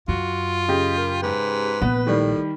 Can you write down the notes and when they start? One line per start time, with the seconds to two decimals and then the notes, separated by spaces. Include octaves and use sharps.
0.08 F#2 F4 F#4
0.68 C#3 G4 D#5
0.98 A#4
1.23 G#2 B4
1.82 A#1 B3
2.07 A2 D#3 G3